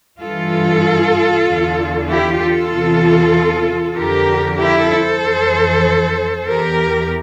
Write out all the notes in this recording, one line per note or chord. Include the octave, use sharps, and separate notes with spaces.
G2 E3 F4 A4
E2 D3
E4 G4
F4 A4
E2 C3 E3
F2 D3 G4 A#4
E4 G4
A4 C5
F2 E3
E2 E3 G4 A#4